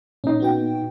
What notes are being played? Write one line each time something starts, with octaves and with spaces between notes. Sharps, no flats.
A#2 C#4 D#4
B3 F#4 G5